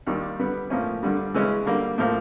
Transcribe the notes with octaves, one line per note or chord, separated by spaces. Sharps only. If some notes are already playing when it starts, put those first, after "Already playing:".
D#2 D#3 G3 A#3 D4
D3 G3 B3
A2 F3 A#3 C#4
G2 D3 G3
C#3 E3 G#3 C#4
D3 G3 A#3
A2 F3 A#3